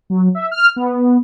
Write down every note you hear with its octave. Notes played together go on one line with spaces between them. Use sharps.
F#3
E5
F6
B3